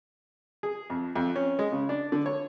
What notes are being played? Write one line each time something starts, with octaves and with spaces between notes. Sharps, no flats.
G#4
F2
F2
C#4
G#3
C#3
D4
D3
C#5